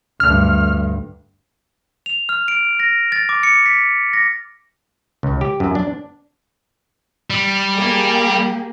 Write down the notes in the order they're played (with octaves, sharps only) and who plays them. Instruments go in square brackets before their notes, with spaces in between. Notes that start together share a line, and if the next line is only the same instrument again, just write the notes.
[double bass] D2 G2 [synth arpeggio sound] F6
[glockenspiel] F7
F6
D7
A#6
A6
D6
C#7
B6
A#6
[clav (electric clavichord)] C#2
G4
F#2
D4
[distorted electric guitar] G3
[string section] A#3 G4 G#4